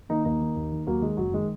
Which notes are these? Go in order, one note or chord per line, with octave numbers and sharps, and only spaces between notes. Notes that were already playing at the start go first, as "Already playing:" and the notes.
D#3 A#3 D#4
D#2 A#3 D#4
D#3
D#2
D#3
D#2 F#3 A#3
D#3 G#3
F#1 F#3
D#3 G#3